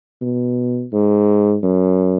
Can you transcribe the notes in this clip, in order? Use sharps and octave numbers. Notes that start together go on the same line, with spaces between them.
B2
G#2
F#2